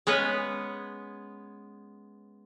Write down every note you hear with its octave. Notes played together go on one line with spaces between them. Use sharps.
G#3 B3 C#4 B4 C#5